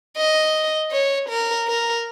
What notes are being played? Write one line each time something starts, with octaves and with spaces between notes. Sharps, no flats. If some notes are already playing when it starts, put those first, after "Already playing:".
D#5
C#5
A#4
A#4